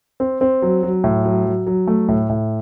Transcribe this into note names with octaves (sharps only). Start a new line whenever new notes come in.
C4
C4
F#3
F#3
A2
F#3
F#3
F#3
A3
A2
A2